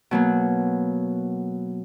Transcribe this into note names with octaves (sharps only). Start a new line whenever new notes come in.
B2 F#3 A#3